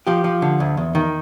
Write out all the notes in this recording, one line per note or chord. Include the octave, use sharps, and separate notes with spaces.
F3 G4
F3
D3
D2
E2
D#3